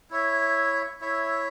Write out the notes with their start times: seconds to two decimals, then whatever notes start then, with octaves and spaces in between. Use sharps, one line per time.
0.10 E4 C#5 E5
1.01 E4 C#5 E5